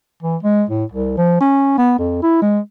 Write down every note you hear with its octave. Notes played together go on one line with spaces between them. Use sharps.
E3
G#3
A2
C2
F3
C#4
B3
F2
E4
G#3